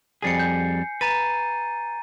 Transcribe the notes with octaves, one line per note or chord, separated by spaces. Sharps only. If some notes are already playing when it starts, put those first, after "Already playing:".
F2 G3 G#4 G#5 C7 C#7
G6
B4 A#5 A6 D#7